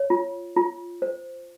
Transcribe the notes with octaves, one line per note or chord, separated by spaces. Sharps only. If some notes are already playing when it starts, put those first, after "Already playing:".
Already playing: C#5
F4
F4
C5